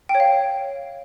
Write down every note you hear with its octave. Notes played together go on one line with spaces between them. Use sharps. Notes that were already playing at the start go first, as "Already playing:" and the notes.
G5
C#5
F5